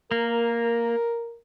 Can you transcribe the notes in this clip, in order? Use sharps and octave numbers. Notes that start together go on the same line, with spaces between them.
A#3 A#4